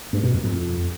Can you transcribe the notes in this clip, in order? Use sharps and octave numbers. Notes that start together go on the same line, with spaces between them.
G2
B2
F2
F2